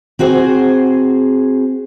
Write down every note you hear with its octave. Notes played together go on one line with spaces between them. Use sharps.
C4 F#4 G#4 C5